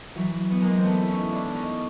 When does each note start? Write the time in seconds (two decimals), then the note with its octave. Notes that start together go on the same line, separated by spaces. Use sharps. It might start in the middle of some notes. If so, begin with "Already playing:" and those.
0.15 E3 F#3
0.50 B3
0.62 G#3 A#3
0.78 C4
0.85 A3 B3
1.02 E4
1.09 C#4 D#4
1.32 D4 E4
1.45 D4
1.55 C#4 D#4